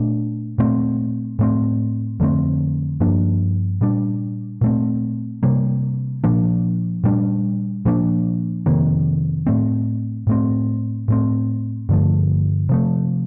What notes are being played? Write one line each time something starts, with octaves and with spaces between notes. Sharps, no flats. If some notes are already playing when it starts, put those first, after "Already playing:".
Already playing: A#2 A3 D4
A#2 A3 C4
A2 A3 C4
F2 D3 A3 C4
G2 F3 A#3 D4
A#2 G3 D4
A#2 A3 C4
C3 G3 A#3
A#2 F3 A#3 D4
A#2 G3 D4
A#2 F3 A#3 D4
F2 C3 D#3 A#3
A2 A3 C4
A2 A3 C4
A2 A3 C4
G2 D3 F3 A3
C3 F3 A3